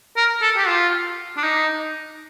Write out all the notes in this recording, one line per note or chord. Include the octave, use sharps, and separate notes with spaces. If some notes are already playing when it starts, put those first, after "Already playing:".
A#4
A4
G4
F4
D4
D#4